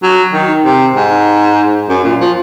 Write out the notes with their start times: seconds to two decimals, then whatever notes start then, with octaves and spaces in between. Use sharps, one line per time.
0.03 F#3
0.33 D#3
0.65 C3
0.96 G#2
1.89 F#2
2.04 A#2
2.20 F3